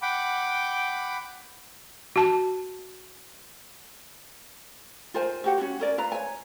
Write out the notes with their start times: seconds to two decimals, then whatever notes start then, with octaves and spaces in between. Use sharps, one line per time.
0.02 F#5 G5 B5 D6
2.16 F#4 A5
5.14 F4 A#4 C5 G#5
5.44 F#4 G4 F#5
5.58 C#4 F4 F#4
5.79 C#4 A#4 D5
5.98 F4 B4 A#5
6.12 C#5 G#5